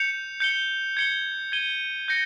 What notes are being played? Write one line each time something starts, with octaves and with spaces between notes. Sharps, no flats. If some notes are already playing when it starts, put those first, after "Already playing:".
Already playing: G6 C#7 F7
G6 C#7 G7
G#6 C#7 G7
G#6 D#7 G7
G6 A#6 C#7